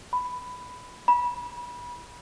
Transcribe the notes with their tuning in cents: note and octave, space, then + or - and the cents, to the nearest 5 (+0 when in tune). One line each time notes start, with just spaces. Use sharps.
B5 +10
B5 -25